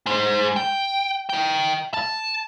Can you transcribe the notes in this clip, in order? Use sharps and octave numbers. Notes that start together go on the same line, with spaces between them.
G#3 C5
G5
D#5 G5
A5